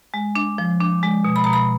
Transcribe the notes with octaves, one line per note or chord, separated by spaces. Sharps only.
G#3
D4
F3
D4
G#3
B2
B5
B2 A#5
B5